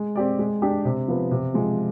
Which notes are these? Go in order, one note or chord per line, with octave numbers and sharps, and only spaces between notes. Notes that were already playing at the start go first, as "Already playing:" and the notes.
Already playing: G#3
C4 G4 D5
G#3
D4 G4 D5
C3
F3 B3
C3
F3 G#3